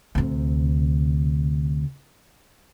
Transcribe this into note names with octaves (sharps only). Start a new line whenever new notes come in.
D2 C3